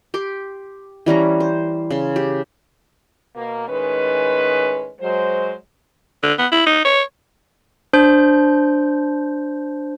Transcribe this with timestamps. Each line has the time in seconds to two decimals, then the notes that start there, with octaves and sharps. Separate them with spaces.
0.14 G4 C6 D6
1.06 E3 G3 C#4 A#5
1.40 C5
1.91 C#3 C6
2.16 G4
3.35 B2 A#3
3.68 A2 D#3 G#3 C#4 B4
5.01 F#3 G#3 C5
6.23 D3
6.38 B3
6.52 E4
6.66 D#4
6.85 C#5
7.93 D4 C5 G6